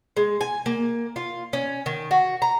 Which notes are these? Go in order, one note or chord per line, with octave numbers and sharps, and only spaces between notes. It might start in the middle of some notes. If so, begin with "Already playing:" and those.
G#3
G#5
A#3
F4
C#4
D#3
F#4
A#5